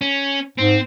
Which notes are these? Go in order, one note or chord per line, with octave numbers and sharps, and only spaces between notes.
C#4
G#2 C4